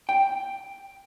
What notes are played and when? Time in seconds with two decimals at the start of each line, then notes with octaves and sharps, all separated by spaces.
0.09 G5